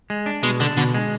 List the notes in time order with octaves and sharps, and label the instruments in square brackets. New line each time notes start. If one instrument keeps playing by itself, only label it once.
[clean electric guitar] G#3
D4
[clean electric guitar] B2 [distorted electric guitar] G#3
[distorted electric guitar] D3 [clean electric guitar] D4
[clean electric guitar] B2 [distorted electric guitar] D3
[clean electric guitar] G#3